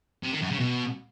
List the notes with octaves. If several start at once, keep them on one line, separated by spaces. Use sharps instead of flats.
C3
D#3
F#2
C#3
B2